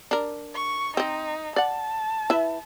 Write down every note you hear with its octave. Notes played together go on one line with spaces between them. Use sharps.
D4 A#4
C#6
C4 D#4 D#5
D5 F#5 A5
E4 B4 E5